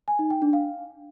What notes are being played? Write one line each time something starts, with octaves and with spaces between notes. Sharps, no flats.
G#5
D#4
G5
D4
F5